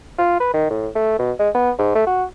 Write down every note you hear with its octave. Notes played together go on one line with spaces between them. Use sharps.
F4
B4
D#3
A2
A3
B2
G#3
B3
G#2
A3
F#4